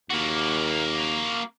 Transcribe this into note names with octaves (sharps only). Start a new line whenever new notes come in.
D#2 A#3 F#4